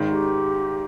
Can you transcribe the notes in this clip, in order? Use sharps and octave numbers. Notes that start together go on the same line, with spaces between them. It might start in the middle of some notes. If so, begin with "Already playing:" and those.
Already playing: G#1 G#2 D#3
G4